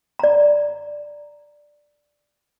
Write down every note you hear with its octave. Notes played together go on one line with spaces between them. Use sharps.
D5 A#5